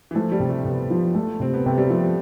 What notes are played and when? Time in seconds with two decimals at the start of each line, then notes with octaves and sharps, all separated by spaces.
0.11 E3
0.15 F3 A3
0.32 G3
0.40 C3
0.49 A3
0.65 C3 B3
0.90 F3
1.15 A3
1.40 C3 C4
1.54 B3
1.66 C3 A3
1.78 G3
1.90 F3 A3
2.03 C4